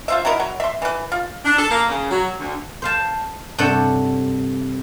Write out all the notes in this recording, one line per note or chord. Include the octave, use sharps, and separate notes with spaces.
F4 C5 E5
F#3 D#4 E4 A#4
F#3
E5 C6
E3 B4
F4
D4
A4
A#3
C#3
F#3
D2
C5 F5 A5
G2 C3 A4 C#5 F#5 A5